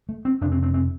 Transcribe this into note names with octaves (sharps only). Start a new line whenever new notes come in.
A3
C4
F2 C3 D4
C4
C4
C4